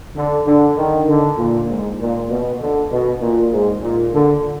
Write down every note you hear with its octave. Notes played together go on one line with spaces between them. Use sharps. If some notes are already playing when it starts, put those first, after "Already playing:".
D3
D3
D#3
D3
A#2
G#2
A#2
B2
D3
B2
A#2
G#2
A#2
D3